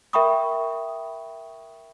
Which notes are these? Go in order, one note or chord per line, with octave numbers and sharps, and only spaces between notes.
A#4 E5 G5 B5 C#6 D#6